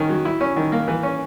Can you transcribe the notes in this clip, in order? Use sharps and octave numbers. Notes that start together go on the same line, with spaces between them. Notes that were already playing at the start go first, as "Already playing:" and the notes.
Already playing: D#3 C#4
F#3
E4
C#4
D#3
A#3
E3
C#4